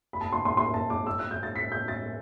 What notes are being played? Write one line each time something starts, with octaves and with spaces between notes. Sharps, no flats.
B5
A5
C6
C6
C6
A5
D6
E6
F#6
G6
A6
B6
G6
A6